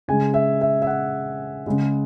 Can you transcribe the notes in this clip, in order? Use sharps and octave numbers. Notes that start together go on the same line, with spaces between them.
C#3 G#3 G#5
E5
E5
E5
F#5
C#3 G#3